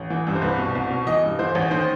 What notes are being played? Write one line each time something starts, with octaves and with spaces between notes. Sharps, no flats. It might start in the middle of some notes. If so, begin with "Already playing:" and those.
Already playing: A1
E3
G2
C5
C2 B4
B2
C2
B2
E3 D#5
G2
E3 C5
A1
D#3 C5